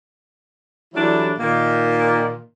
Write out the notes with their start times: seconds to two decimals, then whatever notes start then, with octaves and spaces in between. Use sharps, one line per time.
0.95 E3 F#3 G3 A3 D4 E4
1.39 A#2 D#3 A#3